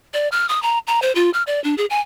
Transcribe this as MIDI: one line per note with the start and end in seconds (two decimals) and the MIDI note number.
0.14 0.28 74
0.32 0.47 89
0.49 0.62 87
0.62 0.79 82
0.87 1.02 82
1.02 1.14 72
1.15 1.30 65
1.34 1.43 89
1.47 1.62 74
1.64 1.75 62
1.78 1.86 68
1.90 2.00 80